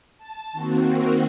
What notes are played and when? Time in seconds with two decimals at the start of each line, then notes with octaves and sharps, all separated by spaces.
0.18 A5
0.52 D#3 A#3 C4 F#4